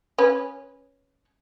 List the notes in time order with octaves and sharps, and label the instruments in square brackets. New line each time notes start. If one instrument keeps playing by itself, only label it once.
[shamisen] C#4 B4